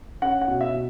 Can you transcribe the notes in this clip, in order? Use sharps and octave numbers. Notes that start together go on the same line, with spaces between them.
C#4 F#5
F#5
B2
E5
B2